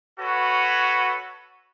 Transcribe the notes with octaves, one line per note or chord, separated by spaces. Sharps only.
F#4 A4 B4 C#5